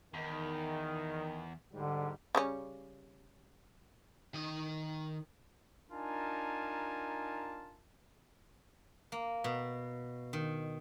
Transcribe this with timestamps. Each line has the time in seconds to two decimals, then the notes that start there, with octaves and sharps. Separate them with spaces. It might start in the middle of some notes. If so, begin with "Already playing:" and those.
0.14 E2 D#3
1.73 G#2 D3 G3
2.35 C#3 G3 C#4
4.34 D#3 D#5
5.91 D4 D#4 F4 A#4 G#5 A5
9.12 A#3
9.44 B2
10.33 D#3